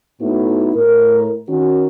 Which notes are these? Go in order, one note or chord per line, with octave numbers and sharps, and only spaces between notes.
A2 A3 B3 D#4 E4 F#4
A2 A#4
D#3 C#4 F#4